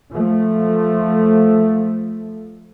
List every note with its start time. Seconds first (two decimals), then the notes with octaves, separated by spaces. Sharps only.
0.12 F3 A3